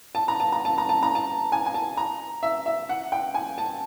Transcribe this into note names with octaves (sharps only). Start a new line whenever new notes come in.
A5
A#5
A5
A#5
A5
A#5
A5
A#5
A5
G#5
G#5
A5
A#5
E5
E5
F#5
G5
G#5
A5